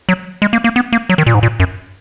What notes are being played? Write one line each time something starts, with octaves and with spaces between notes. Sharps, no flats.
F#3
G#3
A#3
A#3
B3
A#3
F#3
D#3
A#2
G#2
A#2
F#2